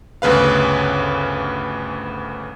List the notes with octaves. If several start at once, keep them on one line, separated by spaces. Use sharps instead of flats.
G1 D2 C#3 B4 F5